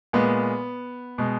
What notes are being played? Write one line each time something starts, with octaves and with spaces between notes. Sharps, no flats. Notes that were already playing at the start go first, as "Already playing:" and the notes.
A#2 G#3 B3
B2 G#3